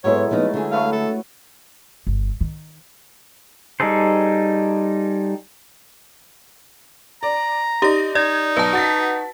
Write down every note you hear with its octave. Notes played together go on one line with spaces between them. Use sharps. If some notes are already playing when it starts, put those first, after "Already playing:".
G#2 F#3 G#3 B3 E4 A4 C#5
F3 A3 B3 D#4
D3 G#4
A3 B4 F5 C#6
A4
G1
D#3
G3 D#4 G#4 A4 C5
D5 A#5
D#4 G4 D5 A#6
D#4 D5 G#6
B1 B4 A5
F#4 A6 B6